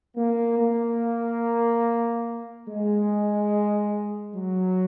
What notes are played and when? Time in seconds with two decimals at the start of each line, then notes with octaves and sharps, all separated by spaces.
0.17 A#3
0.59 A#3
2.69 G#3
4.36 F#3